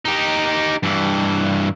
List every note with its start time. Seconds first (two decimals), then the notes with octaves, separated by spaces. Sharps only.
0.05 D#4 G4
0.83 G2 E3